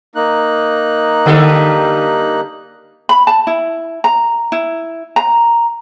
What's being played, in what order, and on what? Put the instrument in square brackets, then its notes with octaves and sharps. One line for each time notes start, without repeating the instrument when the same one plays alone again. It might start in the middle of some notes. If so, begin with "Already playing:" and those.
[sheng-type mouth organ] A#3 D#4 F#6
[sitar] D3 G3 A4
[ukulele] B5
A5
E4
A#5
E4
A#5